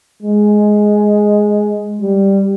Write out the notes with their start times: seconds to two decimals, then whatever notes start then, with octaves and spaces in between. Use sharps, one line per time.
0.23 G#3
2.02 G3